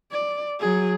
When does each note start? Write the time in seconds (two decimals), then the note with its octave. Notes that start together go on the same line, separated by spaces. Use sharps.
0.12 D5
0.60 F#3 G#4